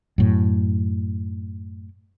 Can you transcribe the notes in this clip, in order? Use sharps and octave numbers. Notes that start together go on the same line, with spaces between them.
F#2 A2